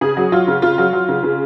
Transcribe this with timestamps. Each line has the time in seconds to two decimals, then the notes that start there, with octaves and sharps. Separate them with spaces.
0.01 C#3 G#4
0.17 F#3
0.32 F#3 F4
0.47 C#3
0.62 C#3 F4
0.78 F#3
0.93 F#3
1.08 C#3
1.23 C#3